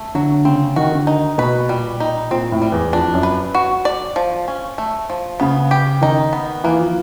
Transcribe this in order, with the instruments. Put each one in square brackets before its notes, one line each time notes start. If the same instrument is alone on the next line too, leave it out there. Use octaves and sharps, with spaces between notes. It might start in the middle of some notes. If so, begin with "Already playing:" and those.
Already playing: [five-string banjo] A3
[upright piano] D3 [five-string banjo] F#3
[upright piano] C#3 [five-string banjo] C4
[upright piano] D#3 [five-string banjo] F#4
[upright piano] D3
[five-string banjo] D#4
[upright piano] B2 [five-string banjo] B4
[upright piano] A#2 [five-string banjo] G3
[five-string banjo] D#4
[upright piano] A#2 [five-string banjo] C4
[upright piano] A2
[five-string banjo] G3
[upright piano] E2
[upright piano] F2 [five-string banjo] D4
[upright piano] F#2
[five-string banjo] B4
F#4
D5
F3
C#4
A3
F3
[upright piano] C#3 [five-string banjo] B3
[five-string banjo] G4
[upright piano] D#3 [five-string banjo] D#4
[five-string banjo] B3
[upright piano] E3 [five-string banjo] A#3
[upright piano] F3